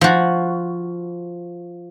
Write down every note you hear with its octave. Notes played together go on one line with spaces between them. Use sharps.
F3 F#4